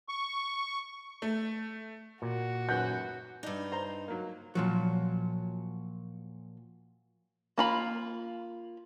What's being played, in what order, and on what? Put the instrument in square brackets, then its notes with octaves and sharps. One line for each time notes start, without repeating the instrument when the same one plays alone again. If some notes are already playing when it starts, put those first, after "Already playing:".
[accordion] C#6
[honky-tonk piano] A3
[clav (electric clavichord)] A#2 [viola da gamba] F#4
[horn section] F#2 B4 F#5 [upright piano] G6
[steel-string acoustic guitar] G2 D#4 [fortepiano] D4
[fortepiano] C5 A#5
F#3 A#3
[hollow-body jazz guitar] A#2 F3 F#3
[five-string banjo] A#3 F4 B5